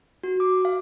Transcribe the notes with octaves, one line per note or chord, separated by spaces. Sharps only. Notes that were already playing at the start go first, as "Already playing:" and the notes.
F#4
D6
F5